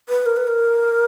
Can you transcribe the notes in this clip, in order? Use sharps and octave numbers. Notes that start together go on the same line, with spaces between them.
B4
A#4
B4
A#4